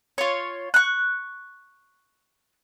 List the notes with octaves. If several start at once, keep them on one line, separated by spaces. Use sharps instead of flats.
F4 C#5
C#6 F#6